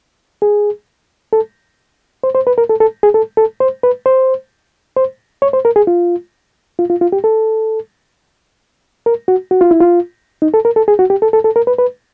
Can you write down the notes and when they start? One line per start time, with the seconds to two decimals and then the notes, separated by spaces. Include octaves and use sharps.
0.42 G#4
1.33 A4
2.24 C5
2.35 C5
2.47 B4
2.58 A#4
2.69 A4
2.80 A4
3.03 G#4
3.14 A4
3.37 A4
3.60 C5
3.83 B4
4.06 C5
4.96 C5
5.42 C#5
5.53 C5
5.65 A#4
5.76 G#4
5.87 F4
6.79 F4
6.90 F4
7.01 F4
7.12 G4
7.24 A4
9.06 A#4
9.28 F#4
9.51 F#4
9.61 F4
9.71 E4
9.80 F4
10.42 D#4
10.54 A4
10.65 A#4
10.76 A4
10.88 G#4
10.99 F#4
11.10 G4
11.22 A4
11.33 A4
11.44 A4
11.56 A#4
11.67 B4
11.79 B4